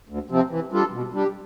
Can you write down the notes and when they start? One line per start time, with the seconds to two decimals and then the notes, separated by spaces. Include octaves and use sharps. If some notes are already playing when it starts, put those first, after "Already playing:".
0.09 D2
0.30 C3 F3 C4
0.50 E3
0.72 G3 D4 F4 A4
0.92 B2
1.13 G3 D4 G4